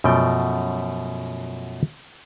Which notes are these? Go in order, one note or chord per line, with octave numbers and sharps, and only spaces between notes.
F#2 B2 F3 A3 G5